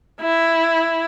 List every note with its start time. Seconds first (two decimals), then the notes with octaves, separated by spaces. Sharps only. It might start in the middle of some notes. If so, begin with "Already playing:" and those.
0.21 E4